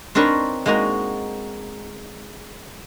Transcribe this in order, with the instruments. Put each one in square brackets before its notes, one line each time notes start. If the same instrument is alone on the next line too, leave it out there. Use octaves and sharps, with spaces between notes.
[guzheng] C4 D4 D#4 A#4 B4 C#5
G#3 A#3 D#4 F#4 A#5